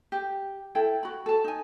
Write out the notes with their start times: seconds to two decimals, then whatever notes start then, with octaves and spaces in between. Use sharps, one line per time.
0.12 G4
0.75 E4 A4 G5
1.03 F#4 B5
1.26 A4 A5
1.44 D#4 G#5